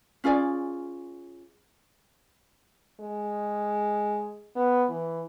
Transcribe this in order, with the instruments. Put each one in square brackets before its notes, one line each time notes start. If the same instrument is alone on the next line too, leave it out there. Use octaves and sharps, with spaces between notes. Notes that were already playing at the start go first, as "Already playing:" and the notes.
[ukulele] C#4 F4 G#4 D5
[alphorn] G#3
B3
E3